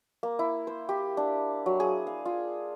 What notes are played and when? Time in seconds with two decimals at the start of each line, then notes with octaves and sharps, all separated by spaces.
0.23 A#3
0.39 E4
0.67 C5
0.89 G4
1.17 D4
1.66 F#3
1.80 G#4
2.07 F5
2.25 F4